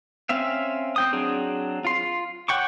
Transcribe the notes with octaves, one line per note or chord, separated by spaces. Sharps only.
C4 C#4 E5 F5
C4 G5 D#6
F#3 C4 D4 G#4
F4 C6
C#5 F#5 G5 C#6 D6